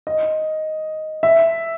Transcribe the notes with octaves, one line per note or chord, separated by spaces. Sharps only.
D#5
E5